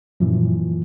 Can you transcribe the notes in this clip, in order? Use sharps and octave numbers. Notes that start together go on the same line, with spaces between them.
F#2 A#2 E3 F3